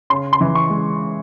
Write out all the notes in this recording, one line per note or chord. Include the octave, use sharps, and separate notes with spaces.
C#3 C6
C6
E3
C#6
G#3